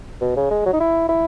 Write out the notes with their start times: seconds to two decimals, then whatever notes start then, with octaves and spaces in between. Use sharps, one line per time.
0.21 B2
0.36 C#3
0.50 G#3
0.66 F#3
0.73 D#4
0.80 E4
1.09 E4